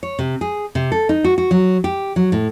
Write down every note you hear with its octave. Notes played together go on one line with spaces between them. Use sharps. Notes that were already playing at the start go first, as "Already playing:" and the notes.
C#5
C3
G#4
C3
A4
D#4
F#4
F#4
F#3
G4
F#3
A2